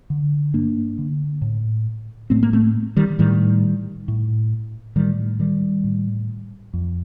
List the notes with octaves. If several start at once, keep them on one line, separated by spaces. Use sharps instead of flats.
D3
G2 A#3 D4
D3
A2
A2 A3 C4
A#3
A3 C4
D#3 G3
A2 D#3 G3
A2
A2 D#3 G3
D#3 G3
A2
F2